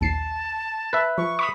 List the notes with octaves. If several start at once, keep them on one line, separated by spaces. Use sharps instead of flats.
A#1 D#2 A5 C7
B4 E5
F3 C#6
B5 C#6 D#6